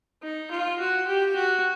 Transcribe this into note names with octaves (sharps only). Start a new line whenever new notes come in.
D#4
F4
F#4
G4
F#4